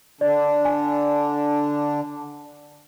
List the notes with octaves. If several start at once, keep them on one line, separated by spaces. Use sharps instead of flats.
D3 D4 D5
G#5